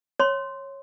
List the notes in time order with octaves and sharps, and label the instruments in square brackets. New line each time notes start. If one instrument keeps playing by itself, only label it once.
[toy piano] C#5 C6